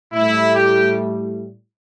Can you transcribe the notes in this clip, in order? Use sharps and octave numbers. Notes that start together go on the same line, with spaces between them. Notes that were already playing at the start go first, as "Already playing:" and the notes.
A2 G3 E4
G4